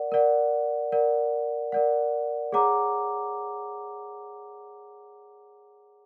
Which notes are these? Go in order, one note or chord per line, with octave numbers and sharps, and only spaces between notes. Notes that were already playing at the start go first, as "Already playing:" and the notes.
Already playing: A#4 D5 F#5
A#4 D5 F#5
A#4 D5 F#5
A#4 D5 F#5
G#4 C#5 F#5 A#5 D6